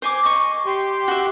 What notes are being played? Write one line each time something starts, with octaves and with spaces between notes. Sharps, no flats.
C5 G#5 D6
D#5 C#6
G4 C6
F#4 E5